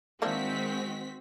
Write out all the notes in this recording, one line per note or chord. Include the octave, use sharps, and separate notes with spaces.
D#3 E3 G#3 A#3 C4 D4 F#4 B6